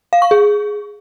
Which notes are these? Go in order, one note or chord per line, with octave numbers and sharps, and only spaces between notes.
F5
C#6
G#4